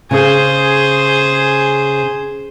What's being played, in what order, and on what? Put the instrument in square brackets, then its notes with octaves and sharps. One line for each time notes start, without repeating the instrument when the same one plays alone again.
[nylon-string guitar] C#3 [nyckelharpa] G#4 C5